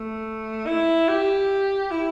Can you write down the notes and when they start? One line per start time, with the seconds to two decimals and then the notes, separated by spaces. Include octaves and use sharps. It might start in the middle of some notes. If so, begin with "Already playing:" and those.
Already playing: A3
0.66 E4
1.08 G4
1.91 E4